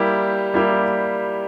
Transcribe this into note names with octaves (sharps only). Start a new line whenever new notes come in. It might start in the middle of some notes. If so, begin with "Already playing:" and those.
Already playing: G3 A#3 E4 G4
G3 A#3 E4 G4